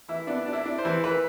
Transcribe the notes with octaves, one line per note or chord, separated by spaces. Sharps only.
E3 E4
B3 D4
D4
E4
D4
C5
E3
E3 B4